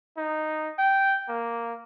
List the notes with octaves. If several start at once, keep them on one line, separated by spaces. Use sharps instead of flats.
D#4
G5
A#3